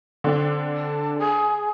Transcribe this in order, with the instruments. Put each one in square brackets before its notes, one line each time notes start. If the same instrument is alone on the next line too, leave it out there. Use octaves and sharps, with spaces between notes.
[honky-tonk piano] D3 C4 D4
[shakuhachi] A5
G#4